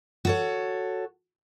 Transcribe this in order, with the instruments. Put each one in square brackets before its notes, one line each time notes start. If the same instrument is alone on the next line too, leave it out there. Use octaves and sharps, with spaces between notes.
[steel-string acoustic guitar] F#4 A4 C#5